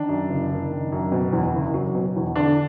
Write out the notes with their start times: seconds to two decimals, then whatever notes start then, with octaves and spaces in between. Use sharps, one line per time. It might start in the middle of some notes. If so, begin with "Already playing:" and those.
Already playing: D#3 D4
0.09 F#2
0.29 F#1
0.50 F#1
0.71 D#3
0.92 F#2
1.12 B2
1.32 E2
1.54 F#1
1.74 F#3
1.95 B2
2.16 E2
2.36 D3 D4